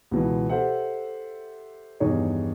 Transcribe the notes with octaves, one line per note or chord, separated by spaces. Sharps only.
C#2 B2 E3
G4 A4 C5 E5 F#5
E2 G2 D#3 D#4 G#4 C#5